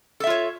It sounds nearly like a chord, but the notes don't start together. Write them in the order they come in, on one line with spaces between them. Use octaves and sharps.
A4 E5 F4 C#5